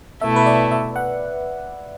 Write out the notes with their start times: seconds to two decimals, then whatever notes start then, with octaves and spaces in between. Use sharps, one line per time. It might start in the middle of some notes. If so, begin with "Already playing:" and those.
0.21 B2 A3 E4 E5
0.36 B4
0.46 D5
0.71 E5
0.96 F#5